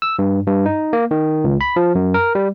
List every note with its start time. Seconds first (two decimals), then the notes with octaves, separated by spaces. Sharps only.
0.02 E6
0.19 G2
0.47 G2
0.66 D#4
0.93 A#3
1.11 D#3
1.44 C#2
1.61 B5
1.76 F3
1.95 F#2
2.14 A#4
2.35 G3